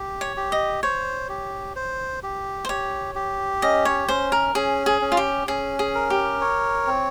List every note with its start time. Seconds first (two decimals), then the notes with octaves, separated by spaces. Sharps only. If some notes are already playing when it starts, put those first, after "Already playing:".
Already playing: G4
0.21 C#5
0.36 G4
0.52 D#5
0.83 C5 C#5
1.29 G4
1.76 C5
2.23 G4
2.65 C5
2.69 G4 C#5
3.15 G4
3.62 C#4 D#5
3.85 C#5
4.08 C#4 C5
4.32 A#4
4.55 C#4 G#4
4.86 G#4
5.02 C#4
5.12 F4
5.17 G4
5.48 C#4 G#4
5.79 G#4
5.95 A#4
6.10 G4
6.41 C#5
6.87 C4